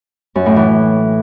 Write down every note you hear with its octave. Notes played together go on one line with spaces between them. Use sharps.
F#2
A2
E3